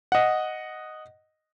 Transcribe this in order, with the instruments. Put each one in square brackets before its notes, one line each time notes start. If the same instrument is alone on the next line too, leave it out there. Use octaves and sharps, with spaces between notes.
[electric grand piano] D#5 F#5